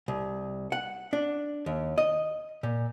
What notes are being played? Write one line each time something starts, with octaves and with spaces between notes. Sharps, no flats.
C2
F#5
D4
D#2
D#5
A#2